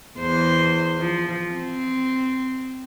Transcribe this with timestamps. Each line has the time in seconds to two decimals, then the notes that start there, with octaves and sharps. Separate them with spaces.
0.19 E2 C5
0.98 F3
1.54 C4